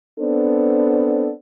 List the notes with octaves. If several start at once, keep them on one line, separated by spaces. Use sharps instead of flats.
B3 C4 D4 A4 C5